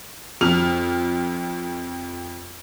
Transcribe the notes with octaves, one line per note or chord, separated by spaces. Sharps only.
F2 F6 F7